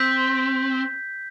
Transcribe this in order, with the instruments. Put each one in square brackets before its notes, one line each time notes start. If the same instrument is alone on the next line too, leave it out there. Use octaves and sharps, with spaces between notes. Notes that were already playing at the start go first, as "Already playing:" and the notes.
Already playing: [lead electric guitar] C4 [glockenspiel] G6 B6